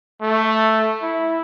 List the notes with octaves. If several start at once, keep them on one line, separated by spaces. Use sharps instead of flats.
A3
E4